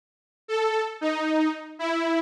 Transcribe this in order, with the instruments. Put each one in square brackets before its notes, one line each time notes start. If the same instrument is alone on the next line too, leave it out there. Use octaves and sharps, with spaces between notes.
[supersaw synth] A4
D#4
E4